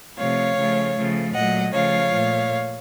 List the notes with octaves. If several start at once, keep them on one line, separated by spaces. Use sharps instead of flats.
C3 F3 A3 C#5 F5
C#3 F3 A3
C#3 F3 A3
A#2 F#3 A3 D#5 F#5
C#3 F3 A3 C#5 F5
A#2 A3